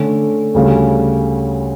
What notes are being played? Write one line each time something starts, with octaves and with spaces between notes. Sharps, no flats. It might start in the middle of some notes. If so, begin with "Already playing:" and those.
Already playing: D3 A3 C#4
D2 C#3 G3 C#4